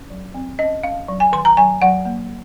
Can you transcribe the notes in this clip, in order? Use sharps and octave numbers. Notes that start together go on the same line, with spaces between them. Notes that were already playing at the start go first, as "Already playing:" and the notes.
Already playing: C#4
F#3
C4
C#4 D#5
C#4 F5
F#3
G#5
D#3 C6
A#5
F#3 G#5
F#3 F#5
A#3